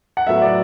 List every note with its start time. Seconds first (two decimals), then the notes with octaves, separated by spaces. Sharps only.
0.17 F#5
0.27 A2 F#3 B3 E5
0.42 D5